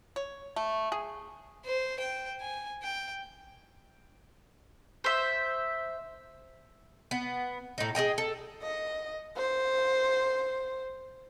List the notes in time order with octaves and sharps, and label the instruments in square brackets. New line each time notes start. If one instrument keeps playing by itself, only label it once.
[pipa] C#5
A3
G#4
[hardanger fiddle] C5
G5
G#5
G5
[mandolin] C5 E5
[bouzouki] B3
A2 D#4
G#4 A#4 D#5 G5
A4
[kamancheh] D#5
C5